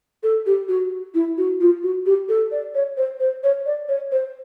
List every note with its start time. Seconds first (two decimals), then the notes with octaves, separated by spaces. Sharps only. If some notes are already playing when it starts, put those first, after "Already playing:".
0.23 A4
0.46 G4
0.69 F#4
1.14 E4
1.38 F#4
1.60 F4
1.83 F#4
2.06 G4
2.29 A4
2.51 D5
2.75 C#5
2.97 C5
3.20 C5
3.44 C#5
3.66 D5
3.88 C#5
4.12 C5